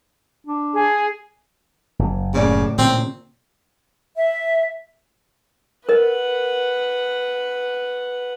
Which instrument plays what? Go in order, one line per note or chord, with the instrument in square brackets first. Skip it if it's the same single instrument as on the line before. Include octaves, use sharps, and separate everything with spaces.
[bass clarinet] D4
[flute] G#4
[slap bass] F#1
[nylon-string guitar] D#2 A2 D5 [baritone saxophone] C#3
[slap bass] A#2 C#3 [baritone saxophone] C4
[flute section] E5
[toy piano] A#4 D#5 [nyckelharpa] B4 F#5